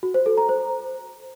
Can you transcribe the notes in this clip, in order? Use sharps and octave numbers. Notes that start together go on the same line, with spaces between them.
F#4
C5
A4
A#5
C5